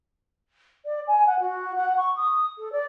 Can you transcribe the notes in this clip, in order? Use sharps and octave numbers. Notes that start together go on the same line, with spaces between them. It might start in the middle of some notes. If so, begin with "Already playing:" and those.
D5
G#5
F#5
F#4
F#5
C#6
D#6
A4
D5